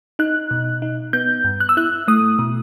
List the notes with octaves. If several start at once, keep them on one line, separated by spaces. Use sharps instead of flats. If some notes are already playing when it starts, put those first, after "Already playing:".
D#4 F#6
B2
D#4
B3 G6
G2
F#6
E6
E4 F#6
A3 D#6
B2